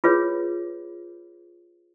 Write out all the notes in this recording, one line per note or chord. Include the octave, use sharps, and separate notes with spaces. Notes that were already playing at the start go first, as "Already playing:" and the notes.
F4 G#4 B4 C#5